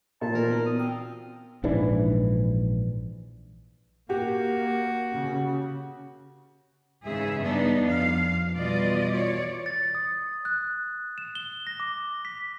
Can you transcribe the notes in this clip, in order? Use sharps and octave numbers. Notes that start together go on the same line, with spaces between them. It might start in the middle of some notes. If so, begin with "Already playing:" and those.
A#2 A5
E3 A#3 A#4 C5
B3 D#4 F#4
D#6
C4 F6
A#1 G#2 E3 D4
A#3 F#4 G4
C#3
G#2 C#3 E3 G#4 E5
G2 B3 D4 D#4
F2 F5
B2 E3 G3 F4 D5 D#5
C#5 D5
A6
D#6
F#6
E7
G7
A#6
D6
B6